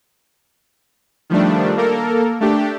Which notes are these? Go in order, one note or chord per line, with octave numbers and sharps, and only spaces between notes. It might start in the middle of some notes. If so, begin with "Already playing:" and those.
D#3 F3 G3 A3 D4
A#3 A4 A#4
A3 D4 G4